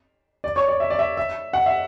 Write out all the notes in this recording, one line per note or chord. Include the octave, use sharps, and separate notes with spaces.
D5
C#5
D5
E5
D5
E5
E5
F#5
E5